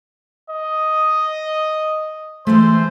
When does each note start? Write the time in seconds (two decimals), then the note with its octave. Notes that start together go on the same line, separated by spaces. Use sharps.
0.50 D#5
2.47 E3 G#3 A3 C5